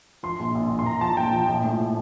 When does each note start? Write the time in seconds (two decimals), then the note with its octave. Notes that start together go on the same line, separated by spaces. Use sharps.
0.23 F3 C6
0.40 A#1
0.55 A#1
0.70 A#1
0.79 C6
0.86 A#1 A#5
1.01 F3 A5
1.17 A#1 G5
1.33 F3
1.49 A#1
1.64 A2
1.80 A2